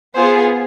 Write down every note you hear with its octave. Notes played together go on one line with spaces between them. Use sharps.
B3 F4 G#4 C5